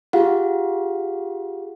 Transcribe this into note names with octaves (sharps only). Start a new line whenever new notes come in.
F4 G4 G#4 F5 F#5